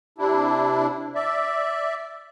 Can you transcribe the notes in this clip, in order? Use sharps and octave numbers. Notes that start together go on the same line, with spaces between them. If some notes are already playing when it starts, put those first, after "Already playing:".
C3 D4 E4
D5 E5